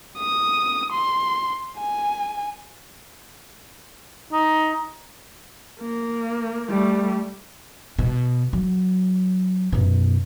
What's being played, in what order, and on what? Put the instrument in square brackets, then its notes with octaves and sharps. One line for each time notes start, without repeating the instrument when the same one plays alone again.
[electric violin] D#6
C6
G#5
[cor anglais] D#4
[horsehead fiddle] A#3
G3 A3
[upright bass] B2
F#3
F#2 B2